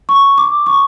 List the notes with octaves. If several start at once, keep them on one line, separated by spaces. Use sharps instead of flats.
C#6
D6
C#6